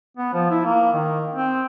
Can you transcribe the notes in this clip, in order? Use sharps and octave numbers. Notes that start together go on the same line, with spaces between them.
B3
F3
E4
A#3
D#3
C4